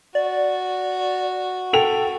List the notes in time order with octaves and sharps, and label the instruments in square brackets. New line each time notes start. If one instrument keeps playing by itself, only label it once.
[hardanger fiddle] F#4 [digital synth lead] D5
[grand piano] A4 F7 [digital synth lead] G5